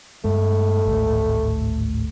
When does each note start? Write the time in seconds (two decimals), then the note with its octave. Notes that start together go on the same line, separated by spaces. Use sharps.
0.24 G2 G#3 A3
0.85 G#1 D2 A2